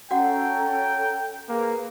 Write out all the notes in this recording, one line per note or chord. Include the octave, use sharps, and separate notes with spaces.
C#4 F#4 A4 F#5 G5 A#5
A#3 G#4 B4